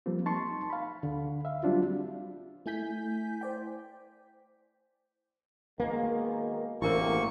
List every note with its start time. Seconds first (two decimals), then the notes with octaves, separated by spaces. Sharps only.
0.06 F3 G3 A#3 C4
0.26 D#4 A5 C6 C#6
0.70 F5 B5
1.03 D2 D3
1.45 E5 F5
1.63 F#3 G3 C4 D4 F4 F#4
2.66 A3 E4 G#5 G6 B6
3.41 C5 D5 G5
5.80 B2 D#3 G#3 A#3
6.82 A1 D2 C3 A#3 E4 A#4 C#5 C#6